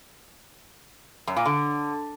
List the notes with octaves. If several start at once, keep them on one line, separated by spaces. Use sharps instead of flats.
F#2
A#2
D3